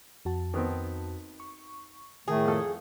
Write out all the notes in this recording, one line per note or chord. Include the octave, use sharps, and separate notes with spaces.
F2 F#4 A5
D#3 B3 C4
C#6
A2 D#3 A3 G#4
F2 A4